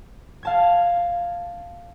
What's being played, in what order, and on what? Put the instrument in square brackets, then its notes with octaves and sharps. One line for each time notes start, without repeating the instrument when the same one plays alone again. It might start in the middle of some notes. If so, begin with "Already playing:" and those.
[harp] F5 A5 G#6